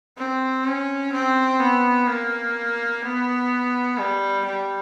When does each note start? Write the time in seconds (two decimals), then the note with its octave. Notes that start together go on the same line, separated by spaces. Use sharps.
0.17 C4
0.65 C#4
1.13 C4
1.60 B3
2.08 A#3
3.03 B3
3.98 G3
4.45 G3